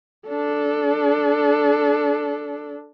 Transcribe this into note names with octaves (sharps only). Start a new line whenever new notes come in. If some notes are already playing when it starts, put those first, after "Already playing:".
D4 A4